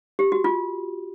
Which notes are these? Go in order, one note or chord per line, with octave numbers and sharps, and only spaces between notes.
G4
F#4
F4